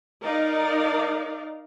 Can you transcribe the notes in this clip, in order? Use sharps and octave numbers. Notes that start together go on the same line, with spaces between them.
D#4 A#4 D5 F5